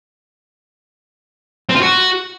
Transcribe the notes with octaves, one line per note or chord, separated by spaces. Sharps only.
C4
F4
F#4